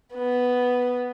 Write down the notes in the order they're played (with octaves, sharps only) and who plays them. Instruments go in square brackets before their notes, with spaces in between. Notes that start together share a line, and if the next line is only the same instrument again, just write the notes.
[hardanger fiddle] B3